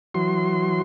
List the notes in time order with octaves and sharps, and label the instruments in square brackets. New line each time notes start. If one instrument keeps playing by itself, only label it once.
[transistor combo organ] E3 F#3 C6